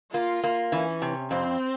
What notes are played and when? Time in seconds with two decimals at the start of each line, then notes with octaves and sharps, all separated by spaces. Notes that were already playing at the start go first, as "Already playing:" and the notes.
0.13 A#3 F4
0.44 A#3
0.72 E3 C#4
1.02 C3
1.31 F2 C4